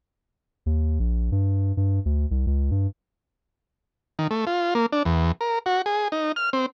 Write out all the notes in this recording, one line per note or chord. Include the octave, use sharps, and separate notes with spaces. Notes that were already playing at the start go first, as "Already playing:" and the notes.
D#2
A#1
G2
G2
D2
C2
C#2
G2
D#3
A3
F4
A#3
D4
E2
A#4
F#4
G#4
D#4
F6
C4